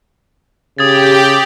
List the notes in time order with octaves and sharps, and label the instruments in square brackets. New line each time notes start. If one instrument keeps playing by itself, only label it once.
[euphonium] C#3 [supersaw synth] G4 [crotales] D#6 G#6 A6